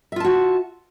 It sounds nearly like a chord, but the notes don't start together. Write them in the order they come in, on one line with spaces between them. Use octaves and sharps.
E5 F4 A5 F#4